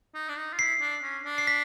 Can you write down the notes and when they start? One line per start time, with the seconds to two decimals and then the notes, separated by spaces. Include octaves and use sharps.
0.15 D#4
0.29 D4
0.37 D#4
0.53 F4
0.59 E4 C7
0.81 D4
1.03 C#4
1.25 D4
1.38 C7
1.47 B6